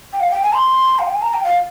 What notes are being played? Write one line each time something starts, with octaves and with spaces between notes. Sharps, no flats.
G5
F5
G5
G#5
C6
F5
G5
G#5
A#5
G5
F5